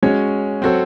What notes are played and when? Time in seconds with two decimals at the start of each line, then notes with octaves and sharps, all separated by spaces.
0.03 G#3 C#4 F#4 C#5
0.62 F#3 C4 F#4 A4 C#5